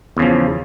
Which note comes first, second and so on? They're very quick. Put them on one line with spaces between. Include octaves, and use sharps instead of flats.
E2 C#3 F3